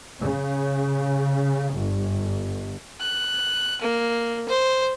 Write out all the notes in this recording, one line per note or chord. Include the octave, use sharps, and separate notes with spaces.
C#3
G1
F#6
A#3
C5